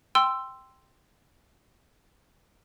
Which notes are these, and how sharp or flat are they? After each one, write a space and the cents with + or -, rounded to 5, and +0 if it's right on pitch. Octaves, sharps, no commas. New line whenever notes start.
G5 +0 C6 +0 E6 +10